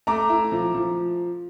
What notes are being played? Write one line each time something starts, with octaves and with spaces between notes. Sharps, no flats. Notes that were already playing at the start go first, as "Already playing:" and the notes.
A3 A#5 D6
E4
F3
F3